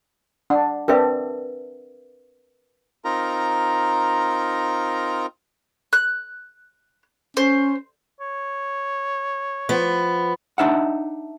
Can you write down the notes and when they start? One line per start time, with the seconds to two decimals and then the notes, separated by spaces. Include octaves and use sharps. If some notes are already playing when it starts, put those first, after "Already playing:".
0.50 D4 F#5
0.88 C4 D4 G4 A#4 B4 E5
3.05 C4 D#4 F4 A#4 A#5
5.93 F#6
7.37 C#4 C5
8.20 C#5
9.69 F3 B3
10.58 D4 D#4 E5 F#5